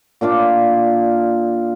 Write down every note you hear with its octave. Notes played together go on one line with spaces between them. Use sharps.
A#2 D4 F4 D6